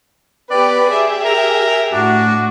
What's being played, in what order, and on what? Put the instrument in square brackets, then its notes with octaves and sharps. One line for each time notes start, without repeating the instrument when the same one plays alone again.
[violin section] B3 G4 B4 [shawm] D5
[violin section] G4 G#4 E5
[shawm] A#4
[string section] A2 F#4 [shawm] D4